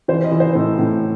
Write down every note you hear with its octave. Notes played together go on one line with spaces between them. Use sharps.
E3 C5
D#5
E3
C5
A2 A4
A2